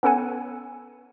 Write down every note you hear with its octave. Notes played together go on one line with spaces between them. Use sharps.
B3 C#4 A4 F#5 G#5